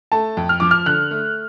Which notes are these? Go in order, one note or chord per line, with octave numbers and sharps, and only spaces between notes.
A3 A5
F2
F6
F3 D6
F6
D3 F#6
A3